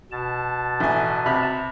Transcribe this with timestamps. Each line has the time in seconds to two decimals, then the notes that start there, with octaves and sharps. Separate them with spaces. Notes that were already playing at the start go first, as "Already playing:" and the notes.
0.11 B2 A5
0.80 A1 G#5
1.26 C3 B5